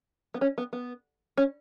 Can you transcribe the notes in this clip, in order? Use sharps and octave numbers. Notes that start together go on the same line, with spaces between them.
B3
C#4
B3
B3
C#4